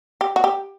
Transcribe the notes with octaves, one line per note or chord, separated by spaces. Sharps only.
G4
F#4
G4